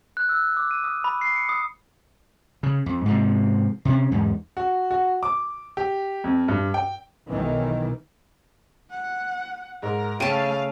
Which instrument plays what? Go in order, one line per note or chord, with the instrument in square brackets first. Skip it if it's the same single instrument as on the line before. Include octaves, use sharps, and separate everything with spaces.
[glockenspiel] F#6
E6
D6
D#7
D#6
B5
C7
C#7
D#6
[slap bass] C#3
F2
G#2 C3 F3
C3 C#4
E2 G#2
[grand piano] F#4
F#4
D6
G4
F2
G2
G5
[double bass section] B1 D#3 E3
[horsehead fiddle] F#5
[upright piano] G#2 [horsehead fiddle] A#4
[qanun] C#3 A5 [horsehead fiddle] A3 F5 [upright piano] G5 D7 D#7